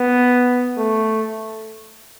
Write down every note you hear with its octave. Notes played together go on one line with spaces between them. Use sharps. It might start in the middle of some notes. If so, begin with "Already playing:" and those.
Already playing: B3
A3